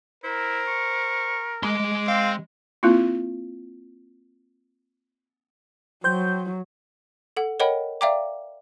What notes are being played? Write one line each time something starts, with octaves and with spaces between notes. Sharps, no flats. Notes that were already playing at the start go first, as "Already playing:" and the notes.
E4 A#4 C5
C#6
G#3 C6 D6
C4 F5
A#3 C4 E4 F4
F#3 C5 G5 G6
A4 F#5
A#4 C#5 D#5 F#5 G5 B5
D5 E5 F5 G5 A#5 D6